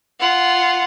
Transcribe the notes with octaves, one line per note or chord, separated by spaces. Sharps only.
F4 F#5